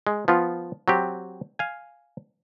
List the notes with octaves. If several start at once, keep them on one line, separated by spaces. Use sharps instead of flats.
G#3
F3 B3 F4
F#3 C4 G4
F5 G#5